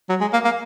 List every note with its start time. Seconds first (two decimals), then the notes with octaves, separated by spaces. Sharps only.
0.09 F#3
0.21 G#3
0.33 A#3
0.44 A#3